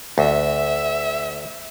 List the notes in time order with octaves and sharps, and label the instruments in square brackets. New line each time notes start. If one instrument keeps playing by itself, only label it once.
[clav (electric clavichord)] D2 [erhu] E5